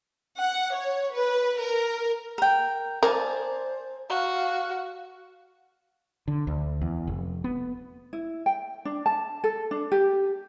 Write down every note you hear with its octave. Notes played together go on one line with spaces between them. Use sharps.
F#5
C#5
B4
A#4
A#4 G5
A#4 C5 D5 G#5 A5
F#4 F5
D3
D2
E2
F1
B3
E4
G5
D4
A5
A4
D4
G4